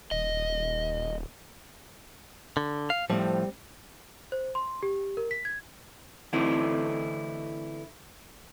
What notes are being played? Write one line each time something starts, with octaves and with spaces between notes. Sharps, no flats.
D#1 D#5
D3
F5
A2 F3 G3 C4
C5
C6
G4
A#4
B6
G#6
D3 E3 A3 C4 D#4 E4